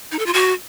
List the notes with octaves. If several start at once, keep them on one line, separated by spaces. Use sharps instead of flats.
D#4
A4
F4
F#4